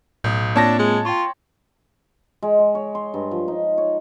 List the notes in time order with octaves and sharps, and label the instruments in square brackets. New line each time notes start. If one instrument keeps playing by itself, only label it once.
[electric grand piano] B1 [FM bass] A2 [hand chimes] D#6 G6
[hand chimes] A#3 C4 F4 [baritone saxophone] D4 [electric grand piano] C#5 A5 A#6
[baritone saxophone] G#3
[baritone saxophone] F4 [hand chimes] G5 C6 C#6
[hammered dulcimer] G#3
G#3
C#5
C6
G2
F3
D#4
C#5